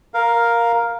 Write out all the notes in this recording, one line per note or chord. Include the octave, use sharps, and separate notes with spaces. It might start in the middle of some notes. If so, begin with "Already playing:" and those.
A#4 F5